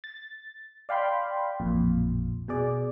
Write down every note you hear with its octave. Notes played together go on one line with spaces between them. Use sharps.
A6
D5 F5 G5 B5 C6
A1 F2 A#2
B2 G#4 D5